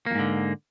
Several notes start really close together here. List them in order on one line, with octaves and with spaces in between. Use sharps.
A#3 F2 G#2 D3